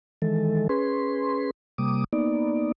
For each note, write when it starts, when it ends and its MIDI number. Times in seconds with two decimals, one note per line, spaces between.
0.22 0.68 51
0.22 0.68 52
0.22 0.68 56
0.22 0.68 69
0.69 1.50 61
0.69 1.50 68
0.69 1.50 71
0.69 1.50 84
1.78 2.04 48
1.78 2.04 55
1.78 2.04 58
1.78 2.04 86
1.78 2.04 87
2.13 2.72 58
2.13 2.72 59
2.13 2.72 63
2.13 2.72 74